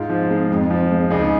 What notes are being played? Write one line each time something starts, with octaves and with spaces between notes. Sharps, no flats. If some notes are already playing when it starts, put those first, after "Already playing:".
Already playing: G#2 F4
F3
G#3
F2
F3
G#3
C#2 D#4 G#4